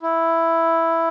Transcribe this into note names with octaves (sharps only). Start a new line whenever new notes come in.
E4